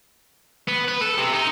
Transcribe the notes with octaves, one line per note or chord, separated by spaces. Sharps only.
B3
B4
A4
C3
D#4